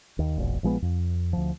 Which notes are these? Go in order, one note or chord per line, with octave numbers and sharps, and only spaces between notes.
D#2
E1 A#1
A#1 F3 G#3 B3
F2
D2 F3